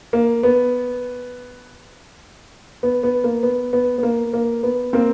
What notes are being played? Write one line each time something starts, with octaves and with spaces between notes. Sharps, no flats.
A#3
B3
B3
B3
A#3
B3
B3
B3
A#3
A#3
B3
A#3 C4